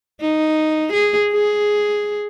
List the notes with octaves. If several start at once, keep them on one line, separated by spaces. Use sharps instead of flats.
D#4
G#4
G#4